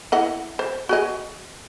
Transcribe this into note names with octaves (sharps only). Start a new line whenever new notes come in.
E4 D#5 F#5
C5
F#4 G#4 D#5